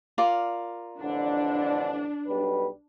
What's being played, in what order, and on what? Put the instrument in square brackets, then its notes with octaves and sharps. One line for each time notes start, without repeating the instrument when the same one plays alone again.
[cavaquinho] F4 A#4 D5
[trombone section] A1 F2 D3 [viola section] D4
[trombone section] B1 G3 B4